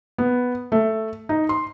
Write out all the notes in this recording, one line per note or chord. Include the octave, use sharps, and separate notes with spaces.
B3
A3
D#4
C6